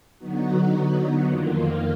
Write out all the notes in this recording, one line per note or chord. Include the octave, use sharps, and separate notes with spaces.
D3 F#3 B3 D#4 F#4
F2 D#3 A#3 F4